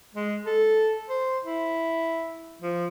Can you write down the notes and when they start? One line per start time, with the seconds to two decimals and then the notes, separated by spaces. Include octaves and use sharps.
0.15 G#3
0.46 A4
1.09 C5
1.44 E4
2.62 F3